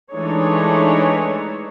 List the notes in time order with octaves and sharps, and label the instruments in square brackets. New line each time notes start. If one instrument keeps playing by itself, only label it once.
[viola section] E3 G#3 A3 D4 D#4 C#5